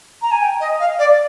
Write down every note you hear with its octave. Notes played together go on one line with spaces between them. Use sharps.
A#5
G#5
G5
D#5
F5
D5